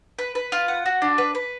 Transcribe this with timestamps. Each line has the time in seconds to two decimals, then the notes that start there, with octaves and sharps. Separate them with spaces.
0.19 B4
0.35 B4
0.52 F4
0.68 F#5
0.86 F#4
1.02 D4
1.18 B4
1.35 B4